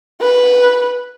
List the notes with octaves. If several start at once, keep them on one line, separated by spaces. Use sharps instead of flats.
B4